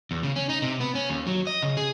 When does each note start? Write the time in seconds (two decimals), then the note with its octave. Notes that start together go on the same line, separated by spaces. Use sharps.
0.11 E2
0.23 C#3
0.36 C#4
0.49 D#4
0.62 C3
0.80 B3
0.95 C#4
1.09 D#2
1.27 F#3
1.47 D#5
1.62 C#3
1.77 G#4